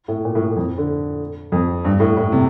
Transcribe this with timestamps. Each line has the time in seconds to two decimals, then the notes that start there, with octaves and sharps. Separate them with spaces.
0.08 A2
0.25 A#2
0.35 A2
0.46 A2
0.56 F2
0.78 D3
1.52 F2
1.85 G2
2.00 A2
2.17 A2
2.32 C3